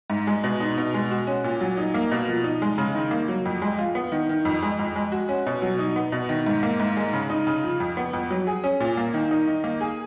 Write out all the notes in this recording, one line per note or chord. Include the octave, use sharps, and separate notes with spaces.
G#2
G#3
B2
D#4
B2
G#3
F#4
C#4
A#2
F#3
D#4
A#3
B2
F3
D#4
G#3
C#3
D#3
A#3
F#3
F2
G#3
F4
B3
D#3
D#3
F2
G#3
F2
G#3
F#4
C#4
B2
F#3
D#4
B3
B2
D#3
G#2
A#3
G#2
G#3
C#3
D#4
C#3
F3
F2
B3
F2
F#3
G#4
C#4
A#2
A#3
D#3
D#4
D#3
A#3
G#4